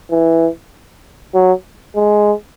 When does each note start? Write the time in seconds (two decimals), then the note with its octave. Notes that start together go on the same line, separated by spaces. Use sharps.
0.11 E3
1.34 F#3
1.96 G#3